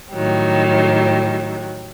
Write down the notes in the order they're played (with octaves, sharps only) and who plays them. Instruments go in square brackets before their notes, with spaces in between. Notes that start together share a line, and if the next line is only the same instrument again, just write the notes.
[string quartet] A2 D#3 F#3 G3